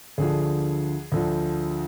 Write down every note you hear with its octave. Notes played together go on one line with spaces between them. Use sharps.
D2 D3 F3 G#4
D2 D3 F3